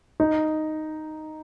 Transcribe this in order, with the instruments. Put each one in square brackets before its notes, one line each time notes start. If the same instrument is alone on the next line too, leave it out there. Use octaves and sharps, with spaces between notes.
[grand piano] D#4